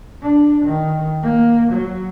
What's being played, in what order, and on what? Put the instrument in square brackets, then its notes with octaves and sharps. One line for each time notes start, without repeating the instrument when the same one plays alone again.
[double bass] D4
D#3
A#3
F#3